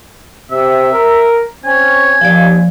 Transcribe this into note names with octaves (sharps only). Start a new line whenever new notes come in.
C3 E5
A#4
C4 C#4 G#5
D#2 F3 D5